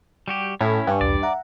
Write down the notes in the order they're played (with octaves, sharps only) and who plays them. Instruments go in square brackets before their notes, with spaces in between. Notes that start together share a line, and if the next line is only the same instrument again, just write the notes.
[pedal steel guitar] G3 F#4 G4
[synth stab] A2 [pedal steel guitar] C#4 E4
[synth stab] G2 [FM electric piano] G5 G#5 C#6
[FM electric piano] B1 E2 [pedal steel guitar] D5
[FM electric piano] E5 F#5 A#5